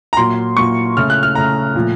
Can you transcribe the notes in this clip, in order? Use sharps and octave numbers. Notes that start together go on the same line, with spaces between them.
A#5
A#2 F#3 A#3 C6
A#2 F#3 A#3 C#6
C#3 A3 F6
F#6
F6
C#3 A3 A#5
A#2 F3 A3